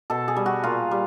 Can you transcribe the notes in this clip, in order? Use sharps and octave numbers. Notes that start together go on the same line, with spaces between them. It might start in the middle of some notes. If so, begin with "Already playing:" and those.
B2 A4
G#4
G3
F#4
A#2 F4
G3